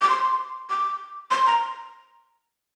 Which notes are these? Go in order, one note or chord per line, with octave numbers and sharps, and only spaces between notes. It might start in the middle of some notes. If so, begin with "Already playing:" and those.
D6
C6
D6
C6
A#5